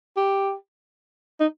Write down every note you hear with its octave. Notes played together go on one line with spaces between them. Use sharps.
G4
D#4